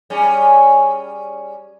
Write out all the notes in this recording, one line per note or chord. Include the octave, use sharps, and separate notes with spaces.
G3 C#4 G#4